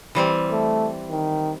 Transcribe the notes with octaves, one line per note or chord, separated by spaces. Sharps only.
E3 G3 C4
A3
D#3